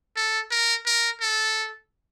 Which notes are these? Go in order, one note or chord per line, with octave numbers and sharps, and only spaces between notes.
A4
A#4
A#4
A4